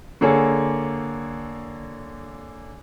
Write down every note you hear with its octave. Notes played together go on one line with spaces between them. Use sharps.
D3 A#3 G#4 A4 C#5